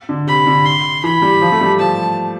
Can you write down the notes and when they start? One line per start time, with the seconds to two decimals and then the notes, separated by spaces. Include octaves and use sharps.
0.09 D3
0.27 C3 B5
0.46 D3
0.66 C6
1.04 E3 B5
1.22 G3
1.41 F3
1.52 A3
1.61 G3
1.79 F3 A5